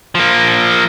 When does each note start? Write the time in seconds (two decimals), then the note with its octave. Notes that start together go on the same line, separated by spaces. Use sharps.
0.15 F3 A#3